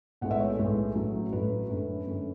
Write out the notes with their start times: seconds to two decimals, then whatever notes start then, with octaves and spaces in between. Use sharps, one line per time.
0.21 B1 A2 G#3 B3 F#5
0.31 E5
0.40 C#5
0.50 A4
0.59 B1 A2 G#3 B3
0.95 A1 A2 F#3
1.33 A1 A2 F#3 B4
1.69 F#2 D3 A3 C#4
2.07 F#2 D3 A3 C#4